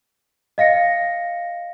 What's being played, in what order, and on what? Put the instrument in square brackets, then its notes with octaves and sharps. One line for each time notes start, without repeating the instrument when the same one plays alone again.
[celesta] D#5 F5 A#6 C#7